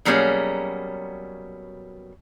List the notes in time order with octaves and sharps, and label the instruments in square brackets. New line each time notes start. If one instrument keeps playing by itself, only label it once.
[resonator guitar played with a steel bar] B2 F#3 G3 A#3 C#4 G#4